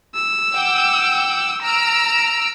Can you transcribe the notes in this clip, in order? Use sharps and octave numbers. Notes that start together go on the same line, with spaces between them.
E6
F#5 G5 D6
A#5 E6 F6 D7